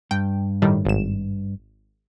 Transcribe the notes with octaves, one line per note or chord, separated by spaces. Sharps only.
G2 G5
A2 D#3 G3
G#1 E7